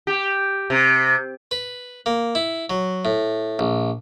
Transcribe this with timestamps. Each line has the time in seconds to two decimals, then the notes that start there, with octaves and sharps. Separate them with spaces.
0.07 G4
0.70 C3
1.51 B4
2.06 A#3
2.35 E4
2.70 F#3
3.05 A2
3.59 A#1